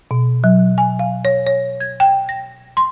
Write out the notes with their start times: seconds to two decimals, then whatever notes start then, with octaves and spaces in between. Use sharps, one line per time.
0.11 B2
0.44 F#3
0.78 G#5
0.99 F5
1.25 C#5
1.46 C#5
1.80 G#6
2.00 G5
2.29 A#6
2.77 C6